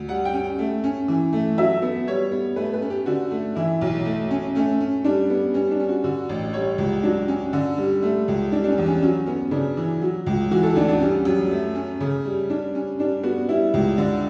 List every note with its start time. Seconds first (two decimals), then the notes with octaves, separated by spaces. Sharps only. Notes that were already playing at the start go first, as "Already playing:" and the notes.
Already playing: D2
0.09 G3 F#5
0.25 G5
0.33 C#4
0.59 A3
0.84 C#4
1.08 E3
1.33 A3
1.58 F#3 E5
1.82 B3
2.07 G3 C#5
2.31 B3
2.56 A3 B4
2.74 B4
2.82 C#4
2.90 G4
3.06 D3 F#4
3.31 A3
3.56 E3 E4
3.81 B1
4.05 A3
4.31 C#4
4.55 A3 C#4
4.81 C#4
5.04 G3 D4
5.30 B3
5.54 G3 C#4
5.71 D4
5.80 C#4
5.88 F#4
6.04 D3 F#4
6.29 A1
6.53 G3 C#5
6.78 C#2
7.03 F#3 D4
7.28 C#4
7.53 D3
7.78 G3
8.02 A3
8.28 C#2
8.52 G3 D4
8.64 D4
8.70 C#4
8.78 E2
8.86 C#4
9.02 F#3 C#4
9.26 B3 C#4
9.51 C#3 D4
9.77 E3
10.02 F#3
10.26 C#2
10.51 E3 F#4
10.63 A4
10.76 D2 D4
10.88 D4
11.00 G3 C#4
11.25 F#2
11.51 A3
11.75 C#4
12.01 C#3
12.25 G3
12.49 G3 D4
12.75 C#4
12.99 G3 D4
13.23 B3 F#4
13.49 G3 E4
13.74 C#2
13.98 D3